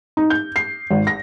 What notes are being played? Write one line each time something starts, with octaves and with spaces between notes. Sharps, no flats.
D#4
G6
C7
G#1
A#6